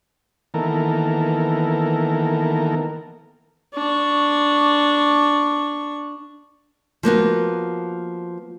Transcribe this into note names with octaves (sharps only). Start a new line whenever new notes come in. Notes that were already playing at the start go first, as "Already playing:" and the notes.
D#3 E3 A#3 B3 A4 A#4
D4 C#6
F3 A#3 B3 F#4